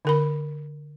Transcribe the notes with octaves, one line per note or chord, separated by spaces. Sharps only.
D3 A#4 B5